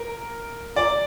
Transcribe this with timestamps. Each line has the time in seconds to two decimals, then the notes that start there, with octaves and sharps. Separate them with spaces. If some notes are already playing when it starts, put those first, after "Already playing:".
Already playing: A#4
0.76 D5